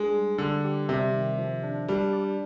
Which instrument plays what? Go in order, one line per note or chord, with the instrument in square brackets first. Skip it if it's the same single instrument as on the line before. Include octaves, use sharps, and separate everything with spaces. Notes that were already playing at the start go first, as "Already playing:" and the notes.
Already playing: [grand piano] G#3 [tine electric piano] D4 D5
[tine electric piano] G3
[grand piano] D3 [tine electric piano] G3
[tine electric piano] G4
[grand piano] C3 [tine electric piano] G3
[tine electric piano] D#3
F3
D4
[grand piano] G3 [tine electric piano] D4
[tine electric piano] D5